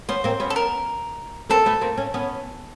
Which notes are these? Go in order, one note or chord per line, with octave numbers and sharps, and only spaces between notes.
B3 C#4 C5
A#3 C4
B3 C#4
A4
A#4
A#3 C4 A4
A3 B3
A#3 C4
C#4
B3 C#4